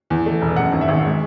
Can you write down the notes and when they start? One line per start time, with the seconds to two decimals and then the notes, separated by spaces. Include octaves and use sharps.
0.10 E2
0.26 A3
0.42 E1
0.56 F#2 F#5
0.72 G#1
0.81 E5
0.88 G#1
1.05 G#3